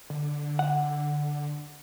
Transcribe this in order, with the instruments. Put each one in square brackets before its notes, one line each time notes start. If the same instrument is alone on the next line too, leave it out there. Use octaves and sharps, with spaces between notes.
[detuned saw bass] D3
[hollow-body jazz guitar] F#5